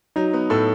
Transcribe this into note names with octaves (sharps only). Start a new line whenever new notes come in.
F#3 D#4
B3
A2 A4